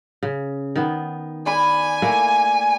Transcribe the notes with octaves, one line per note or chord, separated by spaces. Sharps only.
C#3
D#3 B3
D5 G#5 B5
A3 A#3 E4